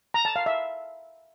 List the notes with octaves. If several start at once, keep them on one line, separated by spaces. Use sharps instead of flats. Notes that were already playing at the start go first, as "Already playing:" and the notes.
A#5
A5
F5
E5